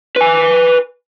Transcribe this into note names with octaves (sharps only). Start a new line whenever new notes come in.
B4 G#5